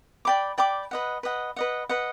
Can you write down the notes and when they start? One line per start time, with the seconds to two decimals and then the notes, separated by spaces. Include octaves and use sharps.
0.25 D5 G5 B5 D6
0.58 D5 G5 B5 D6
0.91 B4 D#5 F#5
1.23 B4 D#5 F#5
1.56 B4 D#5 F#5
1.89 B4 D#5 F#5